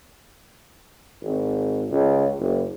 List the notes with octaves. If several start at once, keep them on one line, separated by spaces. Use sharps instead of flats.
G#1
C#2
F#1